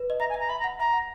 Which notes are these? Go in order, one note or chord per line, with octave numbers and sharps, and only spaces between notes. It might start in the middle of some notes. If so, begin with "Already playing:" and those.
Already playing: B4
D#5
E5 A#5
G#5
E5
A#5
E5 B5
A#5
F#5
E5 A#5
F#5